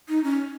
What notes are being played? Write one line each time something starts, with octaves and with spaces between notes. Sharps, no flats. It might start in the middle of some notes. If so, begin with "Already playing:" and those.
D#4
C#4